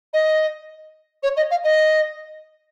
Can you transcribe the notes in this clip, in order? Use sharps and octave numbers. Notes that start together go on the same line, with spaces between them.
D#5
C#5
D#5
F5
D#5